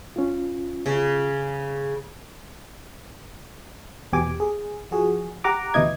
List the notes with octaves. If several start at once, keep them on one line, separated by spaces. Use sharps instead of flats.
C#4 F4
C#3
E2 B2 G4 G#5 D6
G#4
F3 F#4 G#4
G4 F#5 A#5 D6
D2 B2 E3 E4 D#5 G#6